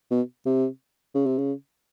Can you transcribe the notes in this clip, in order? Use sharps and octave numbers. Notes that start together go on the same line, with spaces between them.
B2
C3
C#3
C3
C#3